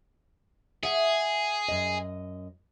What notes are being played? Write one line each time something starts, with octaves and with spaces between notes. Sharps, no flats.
G#4 E5 F#5
F#2 D#5